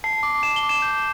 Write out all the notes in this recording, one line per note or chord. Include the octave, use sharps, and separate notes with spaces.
A5 C7
D6
A5 E7
G7
D6
E7
G6